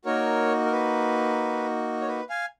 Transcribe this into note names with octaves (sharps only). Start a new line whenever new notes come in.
A#3 D#4 F#4 A#4 C#5
A#4
B4
C#5
B4
F5 G#5